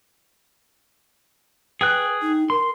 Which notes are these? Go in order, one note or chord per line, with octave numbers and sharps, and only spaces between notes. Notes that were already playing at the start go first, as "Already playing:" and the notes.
G#4 B4 G5 F#6
D#4
A#4 C6